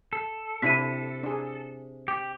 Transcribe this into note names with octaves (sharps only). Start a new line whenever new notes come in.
A4
C3 C4 D4 E4 B6 D#7
D4 G#4
G4